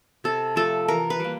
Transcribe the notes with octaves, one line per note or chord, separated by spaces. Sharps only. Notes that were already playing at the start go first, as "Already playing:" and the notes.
C3 A4
F3 A3 A4
E3 A#4
B4
G3 A#3